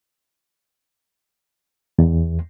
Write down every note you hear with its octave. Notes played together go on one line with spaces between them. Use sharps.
E2